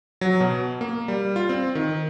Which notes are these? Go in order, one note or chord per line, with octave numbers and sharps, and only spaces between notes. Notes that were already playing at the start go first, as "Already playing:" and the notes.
F#3
B2
A#3
G3
F4
C4
D#3